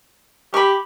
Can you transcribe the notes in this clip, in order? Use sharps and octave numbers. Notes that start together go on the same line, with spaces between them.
G4 B5 C#6